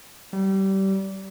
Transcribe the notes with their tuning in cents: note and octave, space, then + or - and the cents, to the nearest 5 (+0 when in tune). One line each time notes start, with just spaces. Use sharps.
G3 -25